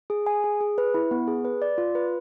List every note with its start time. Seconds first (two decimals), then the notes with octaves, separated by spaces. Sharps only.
0.10 G#4
0.26 G#5
0.44 G#4
0.61 G#4
0.78 B4
0.94 E4
1.11 B3
1.27 G#4
1.45 B4
1.62 D5
1.78 F4
1.95 B4